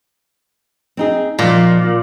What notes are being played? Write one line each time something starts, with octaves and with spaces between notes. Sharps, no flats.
C4 D#4 G#4
A#2 F3 A#3 D#4